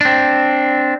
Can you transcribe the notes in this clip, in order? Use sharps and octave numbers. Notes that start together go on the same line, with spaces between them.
C4 D4